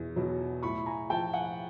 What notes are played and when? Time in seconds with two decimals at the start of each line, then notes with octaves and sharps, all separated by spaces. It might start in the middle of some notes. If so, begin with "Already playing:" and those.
Already playing: E2 B2
0.16 B2 F#3
0.63 A2 B5 C#6
0.86 G#5 A#5
1.10 F3 G5 A5
1.33 F#5 G#5